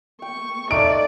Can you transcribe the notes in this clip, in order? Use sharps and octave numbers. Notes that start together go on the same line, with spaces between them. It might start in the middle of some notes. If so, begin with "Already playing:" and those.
G5 C#6
A3 D#4 D5 D7